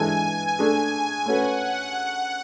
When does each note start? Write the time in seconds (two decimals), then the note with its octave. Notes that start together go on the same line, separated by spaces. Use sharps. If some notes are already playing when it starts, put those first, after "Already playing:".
Already playing: E3 G#3 D4 A4 G#5
0.59 A3 D4 G#4
1.26 A3 C#4 F#4 B4 F#5